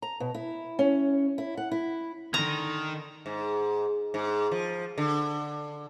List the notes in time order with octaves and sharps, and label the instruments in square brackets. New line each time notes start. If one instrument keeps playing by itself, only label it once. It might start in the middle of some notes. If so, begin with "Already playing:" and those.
[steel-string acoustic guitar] A#5
B2
E4
C#4
E4
F#5
E4
[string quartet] D3 [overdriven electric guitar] D#3 [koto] A#5
[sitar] G#2
G#2
F3
D3